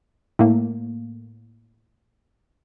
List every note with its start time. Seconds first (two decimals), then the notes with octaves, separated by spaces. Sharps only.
0.39 A2 A#3